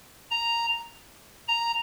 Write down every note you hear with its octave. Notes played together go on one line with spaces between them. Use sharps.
A#5
A#5